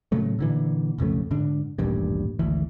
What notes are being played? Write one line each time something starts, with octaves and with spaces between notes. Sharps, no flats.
A2 C#3 F#3 A3
A#2 D3 E3
B1 F2 C#3 A3
G#2 D3 D4
D#1 A1 G2 A#2
G#1 D2 E3